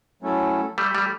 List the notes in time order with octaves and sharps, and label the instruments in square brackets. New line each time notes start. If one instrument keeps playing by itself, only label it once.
[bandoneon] F#3 A3 C#4 E4 A4
[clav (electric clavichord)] G3 A3
G3